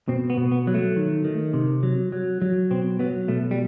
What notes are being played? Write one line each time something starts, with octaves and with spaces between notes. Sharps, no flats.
B2 C4
B3
B2
B3
F#3
A3
D#3
D#3
C3
F#3
F#3
F#3
B2 C4
F#3 B3
B2 A3
G3